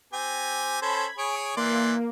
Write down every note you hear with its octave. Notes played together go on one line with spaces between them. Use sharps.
C4 G4 G#5
C#4 A4 C5 B5 G#6
G#4 C#5 D7
E3 A#3 D5 C6